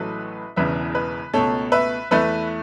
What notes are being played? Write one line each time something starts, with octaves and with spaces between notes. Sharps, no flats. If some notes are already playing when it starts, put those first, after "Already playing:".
Already playing: A1 A2 F#3 A3 B4
E1 E2 C#3 E3 B4 E5
B4
C#2 B2 A3 A4 C#5
B4 E5
E2 E3 A3 B4 E5